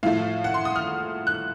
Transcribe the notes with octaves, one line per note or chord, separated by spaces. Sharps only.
A2 F3 A3 F5
F#5
C6
D#6
F6
F#6